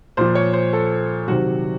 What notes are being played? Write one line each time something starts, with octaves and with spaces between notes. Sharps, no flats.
A#2 F3 C5
C#5
C5
A4
C3 D#3 F#3 F#4